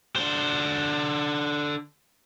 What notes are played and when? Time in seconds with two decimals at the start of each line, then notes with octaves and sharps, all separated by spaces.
0.16 D3 C5